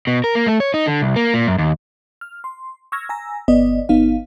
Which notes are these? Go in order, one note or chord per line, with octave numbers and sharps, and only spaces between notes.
B2
A#4
A#3
A3
C#5
D#4
D3
C2
A#3
A#2
F#2
D#2
F6
C6
C#6 E6 F6 G#6 A#6
G#5 A#5 E6 A#6
G1 B3 D5 D#5
G1 B3 D#4 F5